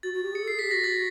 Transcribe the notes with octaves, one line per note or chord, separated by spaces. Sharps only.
F#4 A6
F#4
G4
G#4 C#7
A4
C7
G#4
G4 B6
F#4 A#6
A6